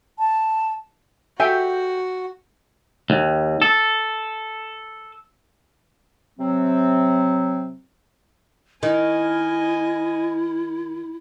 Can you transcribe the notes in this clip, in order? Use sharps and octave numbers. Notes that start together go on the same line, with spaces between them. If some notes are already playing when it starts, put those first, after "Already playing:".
A5
F#4 G4 A4 E5 G5 G#5
D#2
A4
C3 F#3 C4
D#3 E4 D#5 G#5